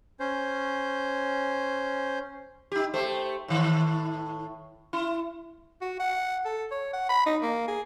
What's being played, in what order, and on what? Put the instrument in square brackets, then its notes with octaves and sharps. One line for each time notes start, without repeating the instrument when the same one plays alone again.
[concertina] C#4 C5
[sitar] D#4 G4
A3 G4 C5
A2 D#3
E4
[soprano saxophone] F#4
F#5
A4
C#5
F#5
B5
D#4
A#3
G#4